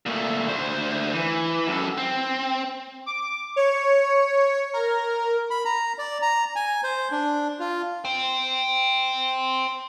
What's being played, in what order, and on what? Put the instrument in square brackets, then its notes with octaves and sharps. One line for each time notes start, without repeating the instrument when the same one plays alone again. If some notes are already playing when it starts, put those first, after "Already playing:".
[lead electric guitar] A#2 A3
D2 C5
E3
F#2 A4
C4
[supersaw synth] D6
C#5
A#4
[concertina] B5
A#5
D5
A#5
G#5
C5
D4
F4
[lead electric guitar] C5 G5